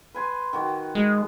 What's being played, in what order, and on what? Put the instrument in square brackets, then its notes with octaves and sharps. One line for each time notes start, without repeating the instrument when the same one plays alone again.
[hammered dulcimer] B4 G#5 C6
D#3 F#4
[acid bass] G#3